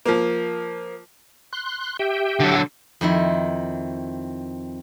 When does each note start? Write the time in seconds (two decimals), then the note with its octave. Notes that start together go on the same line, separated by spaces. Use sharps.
0.06 F3 A#3
1.53 C6 F#6
1.99 G4 E5 G5
2.40 D3 F#3
3.01 F2 D#3 E4